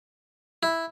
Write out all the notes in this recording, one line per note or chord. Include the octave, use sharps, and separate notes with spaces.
E4